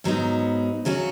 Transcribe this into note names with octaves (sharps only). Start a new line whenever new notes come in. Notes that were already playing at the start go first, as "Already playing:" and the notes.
G#2 F#3 B3 D#4
C#3 F#3 C#4 F#4